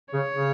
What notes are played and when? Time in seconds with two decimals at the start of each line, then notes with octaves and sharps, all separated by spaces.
0.14 C#3 C#5
0.35 C#3